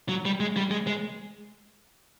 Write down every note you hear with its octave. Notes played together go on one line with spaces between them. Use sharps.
F#3
G3
G#3
G3
G#3
G#3